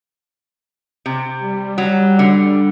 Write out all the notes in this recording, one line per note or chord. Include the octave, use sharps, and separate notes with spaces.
C3
G3
F#3
D3